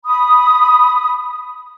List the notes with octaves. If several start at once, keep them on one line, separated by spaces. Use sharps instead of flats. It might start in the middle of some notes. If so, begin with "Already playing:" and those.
B5 D#6